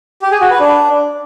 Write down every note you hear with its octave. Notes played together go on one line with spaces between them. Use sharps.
G4
G#4
F#4
B4
D4